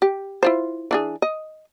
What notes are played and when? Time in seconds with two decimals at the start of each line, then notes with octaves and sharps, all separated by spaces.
0.02 G4
0.43 E4 F4 C5
0.91 E3 D4 G#4
1.22 D#5